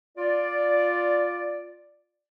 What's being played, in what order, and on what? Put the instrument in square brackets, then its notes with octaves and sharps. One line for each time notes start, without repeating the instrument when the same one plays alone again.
[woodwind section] F4 D5